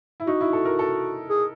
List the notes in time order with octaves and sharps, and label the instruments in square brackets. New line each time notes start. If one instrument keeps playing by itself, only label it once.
[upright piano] E4
[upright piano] D#4 [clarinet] F#4
[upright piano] E4
A4
A#4
A4
[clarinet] G#4